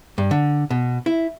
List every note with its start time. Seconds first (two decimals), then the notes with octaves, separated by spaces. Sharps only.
0.18 G2
0.31 D3
0.70 B2
1.06 E4